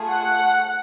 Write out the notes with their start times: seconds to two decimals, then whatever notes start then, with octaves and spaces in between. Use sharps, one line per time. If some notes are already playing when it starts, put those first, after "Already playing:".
Already playing: A3 F4 G#4
0.09 F#5